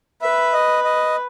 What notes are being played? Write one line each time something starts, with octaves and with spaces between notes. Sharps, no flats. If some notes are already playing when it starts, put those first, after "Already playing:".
B4 E5
D#5
D#5